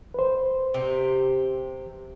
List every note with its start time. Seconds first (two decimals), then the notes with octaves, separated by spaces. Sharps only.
0.14 B4 C5
0.74 C3 G4